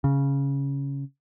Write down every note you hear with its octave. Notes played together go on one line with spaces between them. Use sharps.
C#3